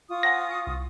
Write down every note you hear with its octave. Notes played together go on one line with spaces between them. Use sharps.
F4 C#6 D#6
C5 F#5 G#5 A#6
C#7
C2